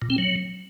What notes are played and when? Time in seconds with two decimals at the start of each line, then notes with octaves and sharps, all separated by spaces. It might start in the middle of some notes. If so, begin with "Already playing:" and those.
0.02 A#2
0.10 C4
0.18 F#3